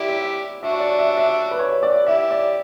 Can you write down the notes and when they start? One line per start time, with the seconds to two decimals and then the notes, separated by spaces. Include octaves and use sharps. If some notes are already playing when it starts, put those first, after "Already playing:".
Already playing: E4 G4 D5 F#5
0.09 E5
0.62 D4 F#4 E5
0.80 D5
0.99 E5
1.18 E5
1.51 B4
1.59 C#5
1.83 D5
2.07 E4 G4 E5
2.31 D5